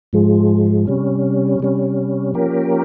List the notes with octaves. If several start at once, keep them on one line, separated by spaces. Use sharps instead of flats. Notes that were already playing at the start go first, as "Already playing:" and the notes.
G#2 F3 G#3
C3 G3 C#4
C3 G3 C#4
F3 A#3 C#4 G4 A#4